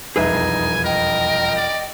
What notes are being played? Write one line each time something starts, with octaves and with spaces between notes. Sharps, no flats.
E1 C2 F2 D#4 G#4 B4 E5 G#5
A#4 D#5 G5
D5